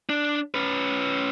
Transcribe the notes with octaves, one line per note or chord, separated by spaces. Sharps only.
D4
C#4 B4